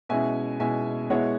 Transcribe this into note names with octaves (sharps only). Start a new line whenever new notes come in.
B2 G#3 C#4 E4 E5 G#5
B2 G#3 C#4 E4 E5 G#5
B2 G#3 B3 E4 C#5 F#5